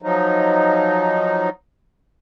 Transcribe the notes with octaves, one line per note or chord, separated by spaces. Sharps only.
F3 F#3 D#4